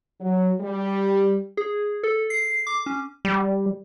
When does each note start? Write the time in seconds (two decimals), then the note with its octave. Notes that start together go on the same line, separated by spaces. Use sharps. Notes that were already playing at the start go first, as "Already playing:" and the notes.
0.21 F#3
0.61 G3
1.57 G#4
2.03 A4
2.30 C7
2.67 D6
2.86 C#4
3.25 G3